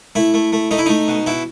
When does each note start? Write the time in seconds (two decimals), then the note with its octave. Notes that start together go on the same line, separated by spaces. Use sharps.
0.15 A3 E4
0.34 A3
0.53 A3
0.71 A3 D#4
0.78 E4
0.86 A3 D#4
1.08 B2
1.26 B2 E4